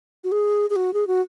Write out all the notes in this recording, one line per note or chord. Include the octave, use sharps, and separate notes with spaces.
F#4
G#4
G#4
F#4
G#4
F#4